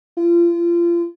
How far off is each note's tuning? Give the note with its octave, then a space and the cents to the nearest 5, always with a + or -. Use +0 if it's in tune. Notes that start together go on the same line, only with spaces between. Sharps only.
F4 -30